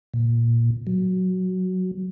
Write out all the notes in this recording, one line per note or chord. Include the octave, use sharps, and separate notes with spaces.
A#2
F#3